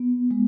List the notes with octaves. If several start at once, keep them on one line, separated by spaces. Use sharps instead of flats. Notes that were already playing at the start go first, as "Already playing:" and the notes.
Already playing: B3
G#3